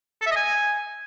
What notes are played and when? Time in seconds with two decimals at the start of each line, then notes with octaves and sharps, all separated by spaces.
0.21 A4
0.26 E5
0.31 D#5
0.36 G#5